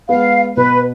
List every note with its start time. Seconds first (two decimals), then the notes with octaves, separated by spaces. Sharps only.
0.09 G#3 B3 F5
0.56 B2 B4